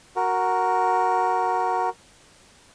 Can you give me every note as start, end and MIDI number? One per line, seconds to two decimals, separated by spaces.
0.16 1.89 66
0.16 1.89 70